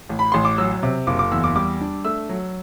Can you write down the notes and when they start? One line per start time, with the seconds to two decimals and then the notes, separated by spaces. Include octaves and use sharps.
0.09 A1
0.19 B5
0.32 A1 C6
0.45 D6
0.58 F#3 E6
0.83 C3
1.07 F#1 D6
1.19 D6
1.32 E2 E6
1.44 D6
1.56 G3 D6
1.81 D4
2.05 A3 E6
2.29 F#3